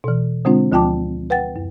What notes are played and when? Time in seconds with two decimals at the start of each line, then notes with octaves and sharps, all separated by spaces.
0.04 B2 E3
0.45 D3 G#3 C4 D4 F4
0.72 D2 F3 F4 G5 A5 D6
1.30 B4 F#5 G5 A6
1.56 F#2